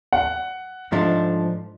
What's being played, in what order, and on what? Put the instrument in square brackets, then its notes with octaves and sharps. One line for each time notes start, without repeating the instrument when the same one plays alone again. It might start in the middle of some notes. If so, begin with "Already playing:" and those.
[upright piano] F#5
[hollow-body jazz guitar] G#2 F3 A3 D4